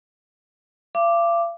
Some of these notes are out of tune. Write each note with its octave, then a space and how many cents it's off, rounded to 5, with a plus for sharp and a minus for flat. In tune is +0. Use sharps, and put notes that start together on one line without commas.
F5 -45 D6 +0